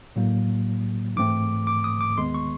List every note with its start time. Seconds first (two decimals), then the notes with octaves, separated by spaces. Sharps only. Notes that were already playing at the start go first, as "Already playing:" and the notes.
0.16 A2 F#3 A#3
1.16 G#2 E3 A3 C4 D6
1.67 D6
1.84 D#6
2.01 D6
2.17 D#2 D#3 G#3 B3 C6
2.34 C#6